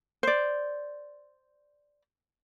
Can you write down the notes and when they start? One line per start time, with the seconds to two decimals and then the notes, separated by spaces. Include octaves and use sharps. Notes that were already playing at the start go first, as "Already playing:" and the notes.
0.23 C5 D5